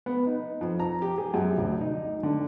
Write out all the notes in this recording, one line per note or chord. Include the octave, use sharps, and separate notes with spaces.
B3
D#4
F2
A#5
G4
G#4
F#2
D2
D#4
D3